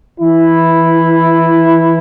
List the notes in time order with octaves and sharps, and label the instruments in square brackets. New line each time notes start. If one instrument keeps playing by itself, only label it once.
[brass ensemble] E3 E4